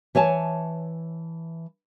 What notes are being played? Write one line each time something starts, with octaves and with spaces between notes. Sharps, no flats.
E3 C#5 G#5 A5